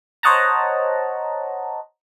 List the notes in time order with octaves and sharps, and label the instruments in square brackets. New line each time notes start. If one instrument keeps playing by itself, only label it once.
[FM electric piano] C5 C#5 D#5 F#5 A5 A#5